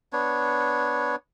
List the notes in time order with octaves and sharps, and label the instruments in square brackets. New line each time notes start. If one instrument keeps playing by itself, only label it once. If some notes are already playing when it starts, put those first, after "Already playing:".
[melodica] B3 D4 C#5